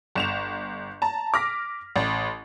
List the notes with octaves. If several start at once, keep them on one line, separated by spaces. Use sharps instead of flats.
G1 E7 F7
A5 A#5
D6 F6 A#6 B6
A1